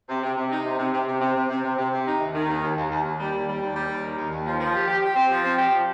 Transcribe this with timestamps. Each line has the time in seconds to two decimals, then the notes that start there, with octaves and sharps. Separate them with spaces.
0.09 C3
0.23 C3
0.37 C3
0.52 D#4
0.66 C3
0.79 C3
0.94 C3
1.08 C3
1.21 C3
1.35 C3
1.50 C3
1.64 C3
1.78 C3
1.92 C3
2.07 D#4
2.21 D#2
2.35 D#3
2.48 D#2
2.63 D#2
2.77 D#2
2.91 D#2
3.05 D#2
3.19 G3
3.33 D#2
3.47 G3
3.62 D#2
3.75 G3
3.89 D#2
4.04 D#3
4.18 D#2
4.31 D#2
4.47 F3
4.60 F3
4.74 G4
4.88 G4
5.03 G4
5.16 C4
5.31 F3
5.44 C4
5.58 G4
5.72 F3